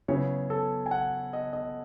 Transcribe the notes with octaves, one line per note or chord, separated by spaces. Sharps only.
C#3 F#3 B3 E4 C#5
A4
G#5
F#5
D#5
D#5